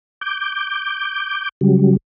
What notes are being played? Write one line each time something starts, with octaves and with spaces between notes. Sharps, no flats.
D6 G6
C#3 F#3 G3